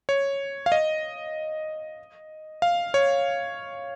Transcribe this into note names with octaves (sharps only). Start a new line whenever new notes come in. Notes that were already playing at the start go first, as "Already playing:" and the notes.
C#5
F5
D#5
F5
C#5